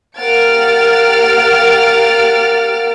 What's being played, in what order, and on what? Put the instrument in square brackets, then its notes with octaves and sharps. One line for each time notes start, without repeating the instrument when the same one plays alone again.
[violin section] A#3 G4 F#5 F6 A6 D7